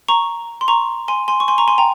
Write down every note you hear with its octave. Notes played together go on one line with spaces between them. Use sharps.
A#5 C#6
C6
A#5 C#6
G#5 C6
G#5 C6
C#6
G#5 C6
A#5 C#6
G#5 C6
G5 A#5